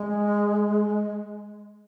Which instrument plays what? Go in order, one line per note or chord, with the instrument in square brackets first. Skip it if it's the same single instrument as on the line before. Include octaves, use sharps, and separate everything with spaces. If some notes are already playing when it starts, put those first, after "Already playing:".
Already playing: [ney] G#3